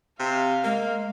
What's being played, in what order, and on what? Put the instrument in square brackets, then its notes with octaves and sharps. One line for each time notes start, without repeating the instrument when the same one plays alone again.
[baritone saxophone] C3 [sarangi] F5
[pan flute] G#3 [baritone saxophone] A#3